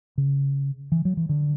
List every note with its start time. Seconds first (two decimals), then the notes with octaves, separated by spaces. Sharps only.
0.18 C#3
0.92 E3
1.05 F#3
1.17 E3
1.29 D3